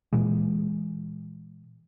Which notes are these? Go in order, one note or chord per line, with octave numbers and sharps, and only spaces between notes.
A#2 E3 G#3